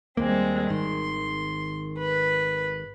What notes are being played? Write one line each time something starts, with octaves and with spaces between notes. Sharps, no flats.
D#2 G3 G#3 A#3 C4
G#1 D#3 C6
B4